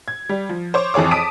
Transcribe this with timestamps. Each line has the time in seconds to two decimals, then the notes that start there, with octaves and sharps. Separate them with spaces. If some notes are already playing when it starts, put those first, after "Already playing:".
0.08 G#6
0.29 G3
0.49 F3
0.74 C5 C#5 D6
0.94 F2 E3 G#4 C#5 D6
1.11 A5 D#6 B6 D7 D#7